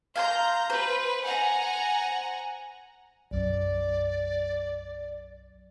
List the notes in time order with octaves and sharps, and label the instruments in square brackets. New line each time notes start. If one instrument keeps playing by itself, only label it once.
[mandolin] F5 G#5 C6 [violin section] A#5 G6
[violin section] B4 [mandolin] C5
[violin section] F#5 G#5 A#5
[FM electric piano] B1 F#2 [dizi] D5